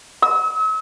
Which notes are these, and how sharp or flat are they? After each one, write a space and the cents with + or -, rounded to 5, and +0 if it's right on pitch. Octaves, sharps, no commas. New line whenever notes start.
E6 -40